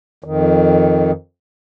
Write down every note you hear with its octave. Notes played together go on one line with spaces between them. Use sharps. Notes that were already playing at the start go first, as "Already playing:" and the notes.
F2 D#3